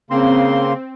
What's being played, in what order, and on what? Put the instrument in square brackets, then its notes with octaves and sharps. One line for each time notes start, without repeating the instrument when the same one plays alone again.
[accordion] C#3 A#3 C6 [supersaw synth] C4